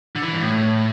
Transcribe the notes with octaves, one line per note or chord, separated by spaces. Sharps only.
D3
E3
G2
A2